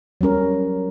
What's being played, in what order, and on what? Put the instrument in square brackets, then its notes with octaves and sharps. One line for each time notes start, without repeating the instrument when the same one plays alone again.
[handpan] F#3 G3 C#4 A#4